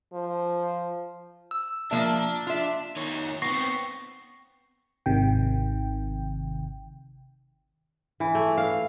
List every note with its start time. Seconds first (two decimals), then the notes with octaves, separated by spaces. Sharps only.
0.13 F3
1.51 E6
1.91 F3 A#3 D4 E5
2.47 F4 E5
2.96 D#3 C#5
3.42 B3 C4 C#6 A#6 C7
5.06 G#1 C3 D#3 G5
8.20 E3
8.35 A3
8.58 F5